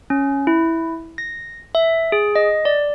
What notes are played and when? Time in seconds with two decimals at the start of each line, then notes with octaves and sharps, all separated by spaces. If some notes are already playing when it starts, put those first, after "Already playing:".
0.10 C#4
0.47 E4
1.18 A#6
1.75 E5
2.12 G#4
2.36 D#5
2.65 D5